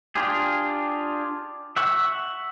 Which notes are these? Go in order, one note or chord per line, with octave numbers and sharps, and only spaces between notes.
D4 F4 G4 G#4
E5 F#5 C#6